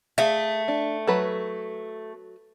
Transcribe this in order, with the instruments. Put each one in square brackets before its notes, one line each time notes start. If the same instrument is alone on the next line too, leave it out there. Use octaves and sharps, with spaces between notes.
[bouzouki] A3 [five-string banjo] G#4 E5 F5
[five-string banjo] D4
F#3 A4 B4